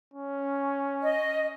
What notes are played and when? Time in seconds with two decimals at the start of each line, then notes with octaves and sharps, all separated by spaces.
0.14 C#4
1.01 D#5